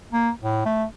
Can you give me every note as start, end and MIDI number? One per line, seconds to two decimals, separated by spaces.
0.12 0.30 58
0.42 0.62 45
0.65 0.84 57